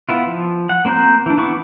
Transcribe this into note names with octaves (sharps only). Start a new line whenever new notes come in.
B3 E4 F4
F3
F#5
A#3 C4 C5 A#5 G6
E3 D4
E3 B3 B5 C#6 D6